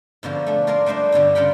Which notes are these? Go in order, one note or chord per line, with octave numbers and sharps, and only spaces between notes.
G#2 B2 D3 F3
A3 D4
F4 A#4 D5 F5 G#5 A#5
G3 A3 D4 C5 D#5
G2 B2 D3 G3
C#3 F4 A#4 F#5 G5 B5